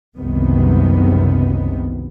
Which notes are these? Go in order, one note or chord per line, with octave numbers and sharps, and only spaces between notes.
F#1 C2 F#2 C3 D#3 B3